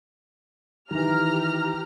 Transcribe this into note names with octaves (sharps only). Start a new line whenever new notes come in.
D#3 E3 G4 A#5 F6